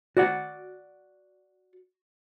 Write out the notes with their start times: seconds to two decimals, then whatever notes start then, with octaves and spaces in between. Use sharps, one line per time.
0.17 F#4 D5 F#5